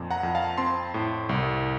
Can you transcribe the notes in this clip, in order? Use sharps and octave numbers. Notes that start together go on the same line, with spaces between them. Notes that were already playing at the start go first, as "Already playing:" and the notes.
Already playing: F2 A#2
F#5 A#5
F2
F5 A5
C4 A5 C6
A2
C2